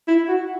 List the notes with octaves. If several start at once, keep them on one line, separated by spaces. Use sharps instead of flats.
E4
F#4